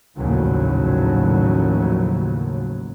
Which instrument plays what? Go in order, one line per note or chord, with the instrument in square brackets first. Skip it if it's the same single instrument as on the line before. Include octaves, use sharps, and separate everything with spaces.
[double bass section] A#1 D#2 A2 C#3 F3 F#3